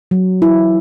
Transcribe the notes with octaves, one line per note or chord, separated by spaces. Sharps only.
F#3
E4